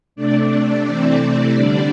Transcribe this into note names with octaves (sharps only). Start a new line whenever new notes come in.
C3 A3 D4 D5
C3 E3 A3 C4 D5
D3 G3 D4 D5